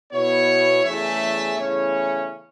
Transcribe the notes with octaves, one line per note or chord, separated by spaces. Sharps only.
B2 B3 E4 C#5
E2 C#3 A3 E5
E2 C#3 A3 C#4 E4 C#5